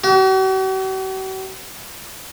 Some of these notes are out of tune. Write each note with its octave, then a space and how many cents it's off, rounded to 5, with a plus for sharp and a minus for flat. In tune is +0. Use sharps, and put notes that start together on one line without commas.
F#4 +45